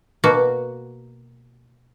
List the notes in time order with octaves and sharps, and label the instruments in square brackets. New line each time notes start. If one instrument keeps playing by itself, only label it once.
[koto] B2 A#3 F#4